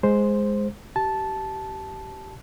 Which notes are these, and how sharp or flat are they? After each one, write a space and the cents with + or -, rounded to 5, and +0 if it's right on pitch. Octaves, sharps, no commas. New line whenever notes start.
G#3 +0 C5 +0
G4 -25 A5 -10